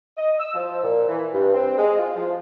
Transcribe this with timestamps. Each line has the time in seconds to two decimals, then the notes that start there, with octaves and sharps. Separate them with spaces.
0.17 D#5
0.38 E6
0.54 F3
0.84 A#2
1.08 E3
1.33 G2
1.53 C4
1.77 G#3
1.98 F4
2.15 F3